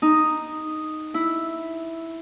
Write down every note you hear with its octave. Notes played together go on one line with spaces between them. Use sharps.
D#4
E4